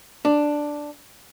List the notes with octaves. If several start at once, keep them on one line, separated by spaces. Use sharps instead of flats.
D4